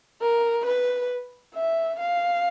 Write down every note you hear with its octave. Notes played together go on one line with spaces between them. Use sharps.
A#4
B4
E5
F5